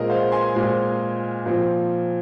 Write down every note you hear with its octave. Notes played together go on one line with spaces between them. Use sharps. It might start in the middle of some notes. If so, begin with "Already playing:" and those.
Already playing: A#2 G#3 C4 G#4 A#4 D#5
C5 F5
G#5 C6
A#2 G#3 C4
A#2 F3 C4